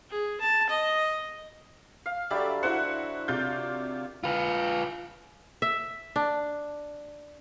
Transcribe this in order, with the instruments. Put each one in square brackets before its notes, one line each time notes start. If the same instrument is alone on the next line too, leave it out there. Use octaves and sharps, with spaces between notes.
[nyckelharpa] G#4
A5
D#5
[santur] F5
[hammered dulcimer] D3 F#3 [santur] G3 [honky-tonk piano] D5 E5
[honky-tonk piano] E4 F#4 C5 [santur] F#5
[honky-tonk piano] C3 G6 [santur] F4 [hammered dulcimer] A#4 D5 D6
[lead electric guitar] F4 B4
[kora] E5
D4